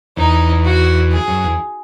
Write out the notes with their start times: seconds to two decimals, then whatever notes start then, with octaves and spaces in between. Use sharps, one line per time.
0.17 E2 D#4
0.65 F#4
1.12 G#4
1.28 F#2
1.44 E2